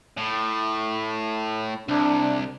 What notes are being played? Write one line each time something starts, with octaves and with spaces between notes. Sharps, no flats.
A2
C2 D4